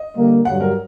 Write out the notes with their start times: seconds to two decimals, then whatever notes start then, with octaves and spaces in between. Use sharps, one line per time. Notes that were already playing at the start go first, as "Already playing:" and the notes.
Already playing: D#5
0.16 D3 G3 A#3
0.45 G2 D3 F#3 F#5
0.60 A#4